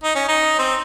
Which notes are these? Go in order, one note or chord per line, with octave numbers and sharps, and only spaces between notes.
D#4
C#4
D#4
C4